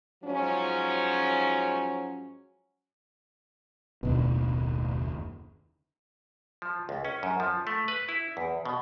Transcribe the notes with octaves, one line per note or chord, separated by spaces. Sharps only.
G#2 F3 F#3 C#4
F#1 D#2 B2 D4
F3
C#2
C#4
F#2
F3
A3
B4
E4
E2
B2